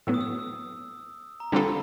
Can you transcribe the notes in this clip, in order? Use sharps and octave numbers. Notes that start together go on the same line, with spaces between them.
A2 F#3 B3 E6
D#6
E6
A#5
D3 G3 C4 F4 A4 B5